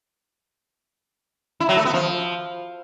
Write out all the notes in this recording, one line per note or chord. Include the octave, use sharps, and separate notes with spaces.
E4
F#3
A3
B3
F3